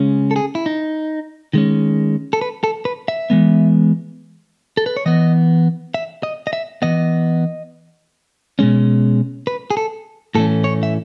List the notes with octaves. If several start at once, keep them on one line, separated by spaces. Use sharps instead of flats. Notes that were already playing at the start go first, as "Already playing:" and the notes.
Already playing: C#3 G#3 C#4
A4
G#4
E4
D#4
D#3 G#3 C#4
A4
B4
A4
B4
E5
E3 G#3 B3
A4
B4
C#5
E3 B3 D#5
E5
D#5
D#5
E5
E3 B3 D#5
B2 G#3 C#4
B4
G#4
A4
A2 E3 A3 C#4 A4
C#5
E5